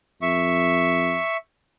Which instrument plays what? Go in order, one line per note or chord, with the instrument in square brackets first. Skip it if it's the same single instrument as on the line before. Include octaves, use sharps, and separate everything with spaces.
[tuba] F2 [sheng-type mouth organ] E5 C#6